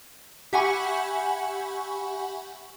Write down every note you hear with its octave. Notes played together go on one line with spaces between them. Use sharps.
G4 E5 F#5 G#5 B5 C#6